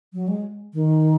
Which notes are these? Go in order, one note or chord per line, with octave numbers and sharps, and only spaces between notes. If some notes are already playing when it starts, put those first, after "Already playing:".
F#3
G#3
D#3